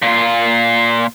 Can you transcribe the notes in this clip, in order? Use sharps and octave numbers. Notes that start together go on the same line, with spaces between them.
A#2 F4